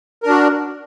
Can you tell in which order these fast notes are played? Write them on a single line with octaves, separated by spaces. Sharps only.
A#4 D4 F#4